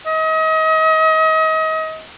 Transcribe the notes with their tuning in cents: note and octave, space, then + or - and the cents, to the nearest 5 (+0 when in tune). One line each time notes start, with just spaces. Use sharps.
D#5 +35